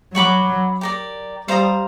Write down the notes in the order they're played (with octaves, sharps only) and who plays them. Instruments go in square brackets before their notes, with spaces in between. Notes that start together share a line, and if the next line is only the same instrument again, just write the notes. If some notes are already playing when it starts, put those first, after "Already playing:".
[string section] F#3 [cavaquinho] C#5 F#5 B5 D6
[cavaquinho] G4 A#4 D5
[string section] G3 [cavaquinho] C5 F5 A#5 D#6